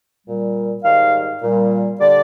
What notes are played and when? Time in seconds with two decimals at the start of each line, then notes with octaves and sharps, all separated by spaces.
0.27 A#2 G3
0.84 G#2 D#3 G3 F5
1.42 A#2 G3
2.00 D3 G3 D5